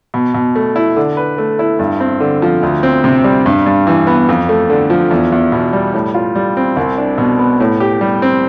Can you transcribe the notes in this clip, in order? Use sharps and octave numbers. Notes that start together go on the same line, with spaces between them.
B2
B2
A3
E4
D3
B4
A3
E4
G2
C4
D3
F3
D2
C4
C3
G3
G2
G2
E3
B3
F2
A3
D3
F3
E2
E2
B2
G3
A2
F4
G3
C4
C2
D4
B2
B3
A2
G4
G3
C4